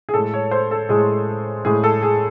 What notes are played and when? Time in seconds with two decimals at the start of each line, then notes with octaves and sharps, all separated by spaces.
0.09 G#4
0.14 A2 G#3 A4
0.34 C#5
0.51 C5
0.71 A4
0.89 A2 G#3 G#4
1.65 A2 G#3 G#4
1.84 A4
2.02 G#4